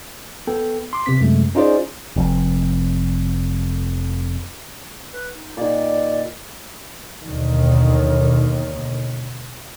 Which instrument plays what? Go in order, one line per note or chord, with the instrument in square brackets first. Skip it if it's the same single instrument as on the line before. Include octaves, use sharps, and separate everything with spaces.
[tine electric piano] B3 A4 G5
C6 D6
C3 B3 C4 B6
F#2 C3 G#3 A3
C#4 D#4 F4 G#4 C5 D5
[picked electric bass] F1 F2
[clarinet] B4
D#4
[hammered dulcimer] A#2 D#3 [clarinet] D5
[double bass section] D#2 B2 D3 D#3